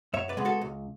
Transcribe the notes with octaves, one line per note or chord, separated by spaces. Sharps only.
F#2 C#5 E5
B4 D5
C#3 G#3 B3
F#4 A4
C#2